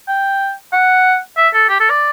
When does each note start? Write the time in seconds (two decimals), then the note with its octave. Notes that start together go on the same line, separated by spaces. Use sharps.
0.08 G5
0.73 F#5
1.37 E5
1.54 A4
1.69 G4
1.80 A4
1.90 D5